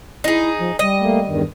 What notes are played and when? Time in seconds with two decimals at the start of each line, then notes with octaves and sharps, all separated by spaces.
0.24 D#4 E4 G#4
0.58 F3
0.79 G3 D#5
1.01 A3 A#3
1.27 E2 G2 D#3